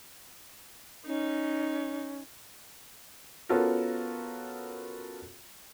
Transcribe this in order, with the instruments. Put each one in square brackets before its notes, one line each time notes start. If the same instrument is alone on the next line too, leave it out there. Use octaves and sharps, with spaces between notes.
[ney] C#4 [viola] D#4
[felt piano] B3 C#4 F4 F#4 A4 A#4